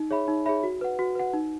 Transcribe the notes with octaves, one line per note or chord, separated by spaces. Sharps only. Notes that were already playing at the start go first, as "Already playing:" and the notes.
Already playing: D#4
G#4 C#5 E5 B5
D#4
G#4 C#5 E5 B5
F#4
B4 F#5
F#4
B4 F#5
D#4